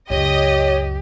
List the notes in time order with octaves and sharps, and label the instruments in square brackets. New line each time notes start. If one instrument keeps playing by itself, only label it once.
[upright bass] C#2 F#2 [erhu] G4 [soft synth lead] C#5 [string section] D#5